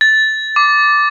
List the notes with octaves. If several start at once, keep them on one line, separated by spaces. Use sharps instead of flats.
A6
D6